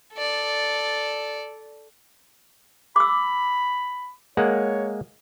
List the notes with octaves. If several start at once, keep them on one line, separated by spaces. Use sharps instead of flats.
A4 D5
B5 D6 E6
G#3 A#3 C#5 F#5